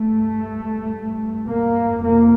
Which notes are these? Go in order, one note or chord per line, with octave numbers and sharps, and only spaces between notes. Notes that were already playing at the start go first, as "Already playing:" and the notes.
Already playing: G2 A3
A#3
F2 C3 A#3